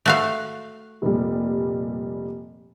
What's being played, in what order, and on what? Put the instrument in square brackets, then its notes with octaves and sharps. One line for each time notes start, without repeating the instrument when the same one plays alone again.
[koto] A3 F#4 F5
[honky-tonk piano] F1 A#2 G3